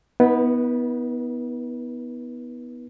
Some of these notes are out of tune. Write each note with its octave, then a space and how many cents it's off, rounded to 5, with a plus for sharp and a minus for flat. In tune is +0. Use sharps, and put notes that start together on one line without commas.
B3 +0 D#4 +45 B4 -35